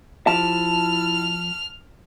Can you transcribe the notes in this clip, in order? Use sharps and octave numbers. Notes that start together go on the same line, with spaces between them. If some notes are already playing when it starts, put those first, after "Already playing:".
F3 E4 G4 A5 F6